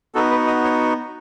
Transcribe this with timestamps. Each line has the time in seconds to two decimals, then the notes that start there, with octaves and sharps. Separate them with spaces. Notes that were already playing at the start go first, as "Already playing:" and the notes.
0.15 B3 D#4 F#4 A4
0.31 B4
0.47 D#5
0.64 C#5